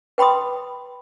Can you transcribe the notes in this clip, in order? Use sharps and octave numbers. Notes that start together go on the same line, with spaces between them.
B4 G5 B5 C6 D#6